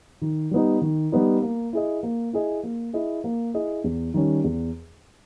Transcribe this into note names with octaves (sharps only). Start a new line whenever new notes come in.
D#3
G3 B3 D#4
D#3
G3 B3 D#4
A#3
E4 G#4 D#5
A#3
E4 G#4 D#5
A#3
E4 G#4 D#5
A#3
E4 G#4 D#5
E2
D#3 G3 C#4
E2